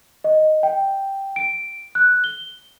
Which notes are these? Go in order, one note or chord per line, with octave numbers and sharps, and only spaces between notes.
D#5
G5
D7
F#6
G7